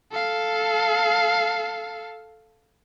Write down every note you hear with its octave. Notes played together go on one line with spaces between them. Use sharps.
A4 F5